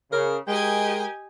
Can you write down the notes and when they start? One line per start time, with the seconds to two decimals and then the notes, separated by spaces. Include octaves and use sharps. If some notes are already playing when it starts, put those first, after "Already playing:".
0.12 C#3 A#4
0.48 G#3 G4 A#4 D#5 G5 G#5